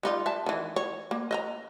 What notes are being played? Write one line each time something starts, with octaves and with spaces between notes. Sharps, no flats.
G3 D#4 F4
E5 A5
D#3 E3
C#5
A#3
D#5 E5 A#5